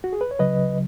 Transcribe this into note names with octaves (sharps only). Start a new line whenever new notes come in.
F#4
G#4
B4
C#5
C#2 C#3 F#3 B4 D#5